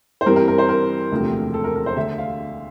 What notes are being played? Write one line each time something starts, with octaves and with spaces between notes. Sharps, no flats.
C5
G2 E3 G3 C4 A#4
A#4
A#4
C5
A#4
E1 D2 C3 F3 A3
A4
A#4
A#4
C5
D2 D3 A3 E5
F5